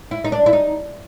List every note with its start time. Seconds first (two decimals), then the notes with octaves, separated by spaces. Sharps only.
0.11 E4
0.24 D#4
0.32 D4
0.46 E4
0.53 D#4